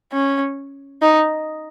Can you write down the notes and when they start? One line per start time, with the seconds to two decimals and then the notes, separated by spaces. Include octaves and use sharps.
0.13 C#4
1.02 D#4